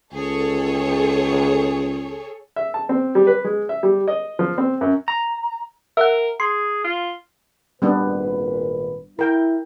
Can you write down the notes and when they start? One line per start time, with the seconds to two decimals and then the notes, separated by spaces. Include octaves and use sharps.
0.13 C#2 G#4 A4 C#5
2.56 E5
2.74 A5
2.89 C4
3.15 G3
3.27 B4
3.45 G#3
3.69 E5
3.83 G3
4.08 D#5
4.39 F3
4.58 C4
4.81 F#2
5.08 A#5
5.97 A#4 E5 F#5
6.40 G#4 C6
6.84 F4
7.82 G#1 A#2 G3 B3 D4 B4
9.19 E4 A#4 G5